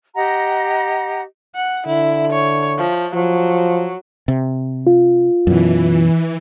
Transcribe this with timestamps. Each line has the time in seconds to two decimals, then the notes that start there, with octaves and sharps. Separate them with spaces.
0.14 G4 D#5 F#5 A#5
1.55 F#5
1.87 D3 E4
2.32 C#5
2.78 F3
3.15 F3 F#3
4.28 C3
4.87 F4
5.47 F#2 B2 E3